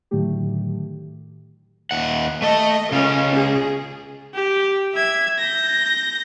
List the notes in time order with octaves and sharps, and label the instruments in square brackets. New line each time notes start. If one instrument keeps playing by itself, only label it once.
[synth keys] A2 D3 D#3 F#3 A3 G4
[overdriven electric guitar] D#2 F#5
[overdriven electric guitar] A3 A4 [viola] D#5
[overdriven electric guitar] C#3 F4 [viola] C#4
[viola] G#4
[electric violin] G4
E5 G#6
G6 A#6